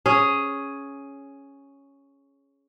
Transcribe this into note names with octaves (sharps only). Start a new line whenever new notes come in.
C#4 G#4